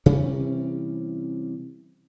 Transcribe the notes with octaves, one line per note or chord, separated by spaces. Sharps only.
C3 E3 G3 C#4